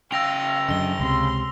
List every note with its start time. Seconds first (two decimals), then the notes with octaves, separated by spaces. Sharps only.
0.12 C#3 F5 G5 E6 A#6 F7
0.69 F#2 D3 D#5 E6 G7
1.00 C#2 C3 C6